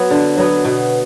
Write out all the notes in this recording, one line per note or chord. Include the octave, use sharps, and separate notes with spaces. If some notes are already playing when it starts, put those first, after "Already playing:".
Already playing: F#3 B3
D3
F#3 B3
B2